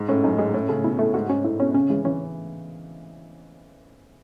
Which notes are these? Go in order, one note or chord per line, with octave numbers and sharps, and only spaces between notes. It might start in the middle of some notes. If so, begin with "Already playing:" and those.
Already playing: G#2
A2 C#4
F#2 D#4
G#2 G#3
A2 C#4
C#3 A3
B2 E4
A2 A3
G#2 F#4
G#2 C#4
A2 E4
B2 C#4
C#3 C#4
E3 G#3
E3 C#4